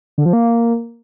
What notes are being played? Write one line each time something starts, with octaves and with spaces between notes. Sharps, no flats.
D3
F3
A#3